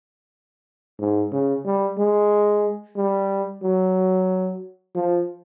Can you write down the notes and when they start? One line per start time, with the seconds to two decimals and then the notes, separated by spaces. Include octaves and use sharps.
0.99 G#2
1.32 C#3
1.65 G3
1.98 G#3
2.97 G3
3.63 F#3
4.95 F3